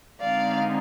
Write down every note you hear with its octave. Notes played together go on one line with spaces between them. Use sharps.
D3 G#3 C4 D#4 D5 F5